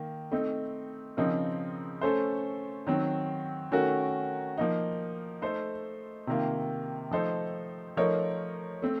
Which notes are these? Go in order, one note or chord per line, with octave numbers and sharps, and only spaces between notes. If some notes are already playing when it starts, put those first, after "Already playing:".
Already playing: D#3 A#3
A3 C4 D#4
C#3 F3 C4 D#4 A#4
A3 C#4 A4 C5
D#3 F#3 C4
D#3 A3 C#4 F#4 A#4
F3 A#3 D#4
A3 D#4 A4 C5
C3 D#3 A#3 F4
F3 A3 D#4 A4 C5
F3 A3 D#4 A#4 C#5
A3 C4